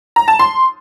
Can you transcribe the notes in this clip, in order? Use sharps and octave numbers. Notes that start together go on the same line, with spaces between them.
A#5
A5
C6